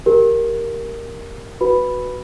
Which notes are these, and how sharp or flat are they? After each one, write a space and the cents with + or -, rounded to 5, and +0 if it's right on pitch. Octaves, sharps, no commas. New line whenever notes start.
G4 +0 A#4 +0
F#4 +0 B4 +0 B5 +0